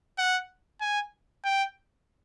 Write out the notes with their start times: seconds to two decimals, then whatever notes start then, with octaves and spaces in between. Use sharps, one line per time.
0.18 F#5
0.81 G#5
1.45 G5